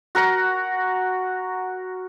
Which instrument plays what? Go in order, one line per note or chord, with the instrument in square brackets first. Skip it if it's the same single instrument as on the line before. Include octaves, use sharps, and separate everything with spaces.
[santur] F#4 A#4 F#5